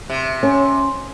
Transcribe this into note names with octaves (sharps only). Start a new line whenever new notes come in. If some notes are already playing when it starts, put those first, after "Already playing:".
C3
C#4